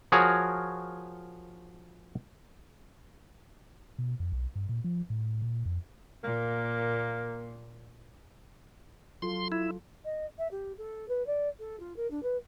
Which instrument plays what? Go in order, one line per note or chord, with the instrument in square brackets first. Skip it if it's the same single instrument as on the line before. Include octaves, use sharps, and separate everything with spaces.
[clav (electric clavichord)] F3 F#4 G#4 A#4 C#5
[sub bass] B2
F2
B1
G2
A#2
F3
A2
A#2
F2
[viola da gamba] A#2 [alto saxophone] A#3
[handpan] F#3 F4 A4 [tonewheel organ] C6
[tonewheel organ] E4
[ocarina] D#5
E5
G4
A4
B4
D5
A4
F4
A#4
D4
B4